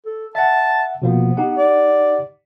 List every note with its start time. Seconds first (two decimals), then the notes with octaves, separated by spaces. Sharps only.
0.06 A4
0.35 E5 F#5 A5
1.02 B2 F3 A#3 B3
1.37 D#4 G4 F#5
1.57 D5